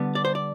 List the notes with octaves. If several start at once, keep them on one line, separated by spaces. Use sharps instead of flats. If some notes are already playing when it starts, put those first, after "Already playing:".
Already playing: D3 G3 B3
D5
C5
D5